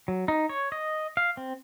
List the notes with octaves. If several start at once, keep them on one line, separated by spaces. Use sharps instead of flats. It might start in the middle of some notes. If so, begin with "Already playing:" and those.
F#3
D#4
C#5
D#5
F5
C4